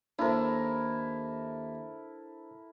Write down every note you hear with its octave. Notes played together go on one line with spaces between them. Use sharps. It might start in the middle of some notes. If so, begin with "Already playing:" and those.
D#2 D4 E4 A4 A#4 C5